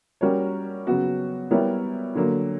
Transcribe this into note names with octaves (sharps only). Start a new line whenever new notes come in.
G3 C#4 F#4 A#4 C#5
C#3 F#3 B3 F#4
G3 B3 E4 A#4 C#5
D3 F#3 A#3